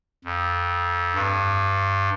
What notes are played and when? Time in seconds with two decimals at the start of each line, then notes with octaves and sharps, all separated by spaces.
0.25 F2
1.15 G2